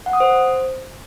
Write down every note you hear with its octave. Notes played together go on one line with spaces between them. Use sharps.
F#5
D#6
C5